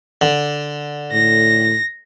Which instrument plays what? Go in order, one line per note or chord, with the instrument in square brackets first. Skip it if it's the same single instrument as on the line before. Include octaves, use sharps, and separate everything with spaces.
[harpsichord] D3
[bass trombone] A2 [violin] A#6